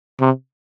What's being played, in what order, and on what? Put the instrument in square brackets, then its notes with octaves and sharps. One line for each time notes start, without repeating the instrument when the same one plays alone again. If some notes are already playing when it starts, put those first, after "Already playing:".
[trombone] C3